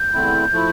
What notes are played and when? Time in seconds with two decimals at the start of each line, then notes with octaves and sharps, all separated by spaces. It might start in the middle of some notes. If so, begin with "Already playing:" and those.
Already playing: G6
0.14 E2 D3 A3 C4 E4
0.53 F3 A3 E4